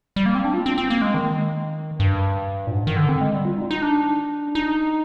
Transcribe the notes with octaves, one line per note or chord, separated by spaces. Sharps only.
G3
A#3
C4
D4
F4
C4
C4
A#3
G#3
D#3
G2
A#2
G#2
D#3
D3
C4
G#3
G3
F4
D#4
D#4
D4
D#4